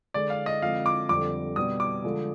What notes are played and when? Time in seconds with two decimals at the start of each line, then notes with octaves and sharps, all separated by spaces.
0.14 D3 G#3 D4 G#4 D5
0.30 F5
0.46 D#5
0.62 D3 F3 G#3 C4 F5
0.86 D6
1.09 F2 D3 G3 C4 D6
1.56 B2 G3 B3 D#6
1.80 D6
2.04 D3 F3 G#3